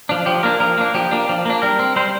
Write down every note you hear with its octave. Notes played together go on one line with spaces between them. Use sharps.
F3 D4
F3 G4
A#3 D4 A#4
F3 A#4
A#3 D4
F3 G4
A#3 D4
F3
A#3 D4
G3 A#4
C4
G3 C5